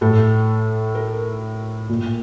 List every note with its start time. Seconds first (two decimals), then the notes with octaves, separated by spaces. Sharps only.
0.01 A2 A4
0.95 A#4
1.89 A#2